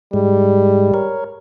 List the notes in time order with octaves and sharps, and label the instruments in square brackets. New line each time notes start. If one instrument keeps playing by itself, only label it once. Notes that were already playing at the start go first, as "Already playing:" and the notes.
[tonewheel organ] G#2 G#3 [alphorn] G3
[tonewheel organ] A#4 C#5